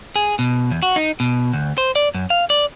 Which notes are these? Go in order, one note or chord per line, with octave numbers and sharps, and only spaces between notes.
G#4
B2
E2
F#4
D#4
B2
D2
C5
D5
F#2
F5
D5